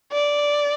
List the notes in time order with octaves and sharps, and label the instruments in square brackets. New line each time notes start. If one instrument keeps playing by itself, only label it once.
[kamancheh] D5